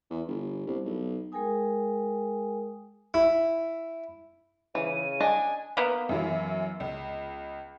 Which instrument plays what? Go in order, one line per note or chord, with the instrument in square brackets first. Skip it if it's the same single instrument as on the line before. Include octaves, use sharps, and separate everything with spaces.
[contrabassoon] E2
G1
C2
B1
[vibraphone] G#3 G#4 A#4 G5 G#5 D#6
[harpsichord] E4
[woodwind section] C#3 [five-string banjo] E3 [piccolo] D#7
[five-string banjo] D4 D#5 [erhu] G#5
[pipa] A#3 B3
[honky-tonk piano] F#2 E3 F#3
C#2